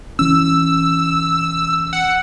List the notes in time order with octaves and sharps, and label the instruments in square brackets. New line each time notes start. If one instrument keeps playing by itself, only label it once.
[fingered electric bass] E3 C#4 [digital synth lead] E6
[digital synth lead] F#5